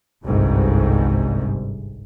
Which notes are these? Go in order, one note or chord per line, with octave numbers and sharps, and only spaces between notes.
G1 C2 G#2 C3